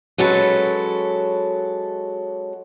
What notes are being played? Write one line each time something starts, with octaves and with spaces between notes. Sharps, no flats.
F#3 G#3 C#4 A4 B4